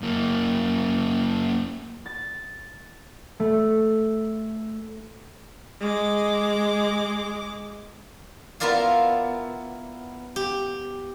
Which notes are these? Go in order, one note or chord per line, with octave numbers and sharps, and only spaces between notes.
F#2 A#3
A6
A3
G#3 D6
B3 E4 F4 A#4 D5 F5
G4